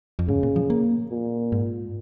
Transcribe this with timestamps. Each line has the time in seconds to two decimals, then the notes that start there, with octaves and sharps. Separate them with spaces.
0.19 F2
0.28 G#2 C#3
0.43 A#2
0.56 F3
0.70 A#3
1.11 A#2
1.52 G#2